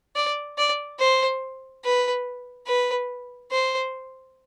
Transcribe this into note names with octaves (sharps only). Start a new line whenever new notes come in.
D5
D5
C5
B4
B4
C5